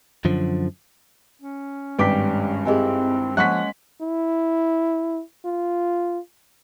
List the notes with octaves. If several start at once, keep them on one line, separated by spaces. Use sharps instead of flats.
F#2 D3 F3
C#4
G#1 G2 G4 B4 D5 G5 D6 B6
C4 E4 G4 G#4 A#4 D#5 G#5
F3 G#3 A#3 C#4 F#5 C#6 F#6 B6
E4
F4